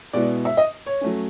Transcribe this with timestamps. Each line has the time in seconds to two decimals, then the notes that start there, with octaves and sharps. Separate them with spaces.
0.13 B2 G#3 B3 E4 D5
0.45 E5
0.57 D#5
0.86 C#5
1.01 F#3 A3 C#4